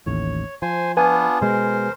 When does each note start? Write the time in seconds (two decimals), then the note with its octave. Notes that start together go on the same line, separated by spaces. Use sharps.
0.06 A1 D#2 A2 C#5
0.62 F3 C5 G#5
0.97 B3 D4 F4 B4 G#5
1.41 B2 G#3 A#4 C5